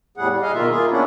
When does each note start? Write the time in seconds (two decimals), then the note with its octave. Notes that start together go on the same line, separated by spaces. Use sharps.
0.17 E2 A2 G3 G#4 F#5
0.29 G3
0.42 G#4 D#5 F5
0.54 B2 D#3 A#3 F4 E5
0.71 A#3 F4 G#4
0.90 B3 C#4 D4 E4